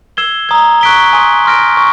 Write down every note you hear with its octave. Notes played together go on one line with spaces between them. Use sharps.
E6 G#6 C7 E7 G7
A#5 D#6 G#6
C#6 F#6 B6 D7 G7
G#5 C6 D#6
C6 F6 A#6 D7
C#6